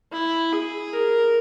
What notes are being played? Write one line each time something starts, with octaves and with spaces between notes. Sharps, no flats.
E4
G#4
A#4